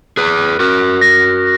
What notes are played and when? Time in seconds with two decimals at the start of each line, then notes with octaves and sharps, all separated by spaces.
0.17 G#4 B4 F#6
0.60 F#4 A#4 F#6
1.01 A#6